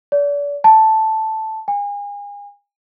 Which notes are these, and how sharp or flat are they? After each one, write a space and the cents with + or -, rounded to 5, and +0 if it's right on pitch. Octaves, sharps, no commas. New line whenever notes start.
D5 -35
A5 +0
G#5 -35